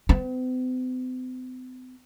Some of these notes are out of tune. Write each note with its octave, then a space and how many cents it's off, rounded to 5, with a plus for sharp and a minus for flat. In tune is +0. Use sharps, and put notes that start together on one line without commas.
C4 -45